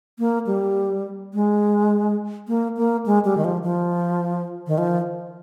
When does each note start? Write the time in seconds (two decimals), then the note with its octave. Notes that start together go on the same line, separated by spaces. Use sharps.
0.19 A#3
0.47 G3
1.34 G#3
2.48 A#3
2.77 A#3
3.06 G#3
3.25 G3
3.37 D#3
3.44 F3
3.63 F3
4.67 D#3
4.78 F3